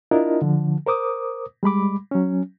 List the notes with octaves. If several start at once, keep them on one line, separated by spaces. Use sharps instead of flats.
D4 E4 F4 A#4 D#5
D3 F3
A#4 C5 D6 D#6
G3 G#3 B5 D6
F#3 C#4